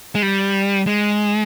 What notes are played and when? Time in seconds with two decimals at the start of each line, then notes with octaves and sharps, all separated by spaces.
0.15 G#3
0.22 G3
0.87 G#3